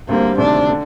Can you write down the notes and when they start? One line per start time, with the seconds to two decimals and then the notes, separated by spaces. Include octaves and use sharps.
0.09 D2 D3 G3 A#3 C4
0.38 D2 C3 D#3 A3 D4
0.69 D3